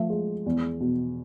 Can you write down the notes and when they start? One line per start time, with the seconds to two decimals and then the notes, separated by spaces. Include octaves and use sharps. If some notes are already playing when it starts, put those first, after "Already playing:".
Already playing: F3 A3
0.10 G#3
0.46 E2
0.80 B2